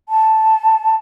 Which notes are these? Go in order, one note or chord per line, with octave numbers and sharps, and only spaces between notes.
A5